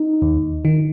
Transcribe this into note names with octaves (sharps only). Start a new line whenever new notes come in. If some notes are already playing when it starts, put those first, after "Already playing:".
Already playing: D#4
D#2
D#3